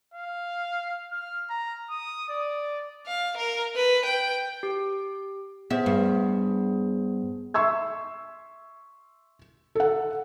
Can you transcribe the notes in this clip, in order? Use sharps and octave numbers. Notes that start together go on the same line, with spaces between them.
F5
F6
A#5
D#6
D5
F5
A#4
B4
G5
G4
B3 G#4 C5 E5
G2
E5 C6 C#6 E6 G#6
A4 F#5